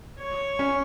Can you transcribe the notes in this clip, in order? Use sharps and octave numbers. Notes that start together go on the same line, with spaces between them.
C#5
C#4